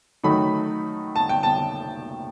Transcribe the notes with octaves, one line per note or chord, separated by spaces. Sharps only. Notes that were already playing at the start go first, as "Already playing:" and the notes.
D#3 F#3 A3 D#4 B5
A5
G5
A5